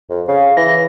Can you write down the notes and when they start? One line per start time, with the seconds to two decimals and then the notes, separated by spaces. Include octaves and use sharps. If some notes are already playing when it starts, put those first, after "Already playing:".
0.10 F2
0.28 C#3 F5
0.57 E3 A#6